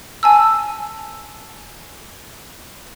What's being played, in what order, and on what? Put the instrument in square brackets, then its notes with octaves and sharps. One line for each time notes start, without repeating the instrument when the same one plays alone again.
[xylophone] G#5 A5 E6